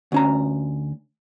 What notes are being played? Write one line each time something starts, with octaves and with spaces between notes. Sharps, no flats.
D2 C#4 A#5